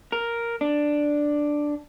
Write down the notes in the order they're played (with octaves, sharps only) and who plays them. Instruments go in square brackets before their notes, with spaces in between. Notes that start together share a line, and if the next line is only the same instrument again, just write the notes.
[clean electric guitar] A#4
D4